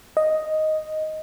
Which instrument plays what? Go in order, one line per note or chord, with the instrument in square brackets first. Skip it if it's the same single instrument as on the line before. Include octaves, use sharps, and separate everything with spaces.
[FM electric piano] D#5